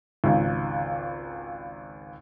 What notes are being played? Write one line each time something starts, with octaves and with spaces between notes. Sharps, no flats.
G#1 C#2